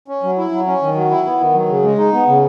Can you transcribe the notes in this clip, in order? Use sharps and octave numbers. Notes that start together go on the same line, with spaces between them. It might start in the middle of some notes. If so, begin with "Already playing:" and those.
C#4
F#3
E4
F#3
C#4
D#3
F#3
E4
B3
D#3
F#3
C#3
G#3
D#4
B3
C#3